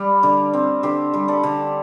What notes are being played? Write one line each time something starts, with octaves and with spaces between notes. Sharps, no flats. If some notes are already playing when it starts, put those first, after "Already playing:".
Already playing: G3 D5
D3
C4
D3 G4 C5
G3
A4 D5
D3